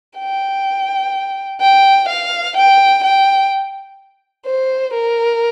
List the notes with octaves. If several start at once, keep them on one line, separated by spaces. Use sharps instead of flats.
G5
G5
F5
G5
G5
C5
A#4